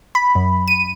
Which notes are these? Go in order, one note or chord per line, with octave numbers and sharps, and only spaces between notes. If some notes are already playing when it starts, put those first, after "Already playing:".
B5
F#2
D#7